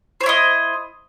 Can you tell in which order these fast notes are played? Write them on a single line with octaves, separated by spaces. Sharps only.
C5 C#5 E4 D#5